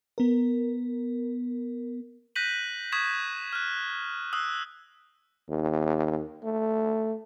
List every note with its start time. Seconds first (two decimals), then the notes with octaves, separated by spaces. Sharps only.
0.18 B3 A#4
2.36 F#6 G6 A#6 B6 D#7 F#7
2.92 C#6 D#6 G#6 B6 E7
3.53 F6 F#6
4.33 D#6 E6 F#6
5.49 D#2
6.44 A3